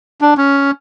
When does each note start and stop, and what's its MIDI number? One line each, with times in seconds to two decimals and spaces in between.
0.21 0.34 62
0.37 0.71 61